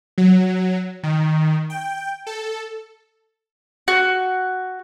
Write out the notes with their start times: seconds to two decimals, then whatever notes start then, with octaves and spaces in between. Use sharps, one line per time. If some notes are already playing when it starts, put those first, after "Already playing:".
0.18 F#3
1.03 D#3
1.70 G5
2.27 A4
3.88 F#4